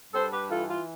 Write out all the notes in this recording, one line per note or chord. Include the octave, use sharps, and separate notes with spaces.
G2 A4 C5
G4 B4
E3 F4 A4
F4